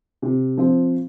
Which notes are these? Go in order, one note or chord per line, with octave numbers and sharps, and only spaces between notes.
C3
F3 C4 F4